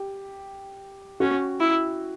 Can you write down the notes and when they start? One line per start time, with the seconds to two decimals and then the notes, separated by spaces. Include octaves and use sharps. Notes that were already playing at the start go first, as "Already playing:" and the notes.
Already playing: G4
1.20 C#4 F#4
1.60 E4